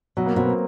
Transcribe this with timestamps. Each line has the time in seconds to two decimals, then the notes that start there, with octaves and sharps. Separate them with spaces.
0.17 B2 F#3
0.26 A#3
0.36 B2 C4
0.46 B3